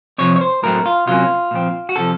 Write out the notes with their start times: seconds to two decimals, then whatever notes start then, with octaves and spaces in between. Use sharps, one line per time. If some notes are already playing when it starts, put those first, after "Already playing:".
0.18 C3 F3 C4 C#5
0.36 C#5
0.41 C5
0.63 A2 F#3 A3 C4 A#4
0.86 F4
1.07 C3 F#3 A#3 C#4 F4
1.51 A#2 F3 C4
1.89 F#4
1.96 C3 F3 A4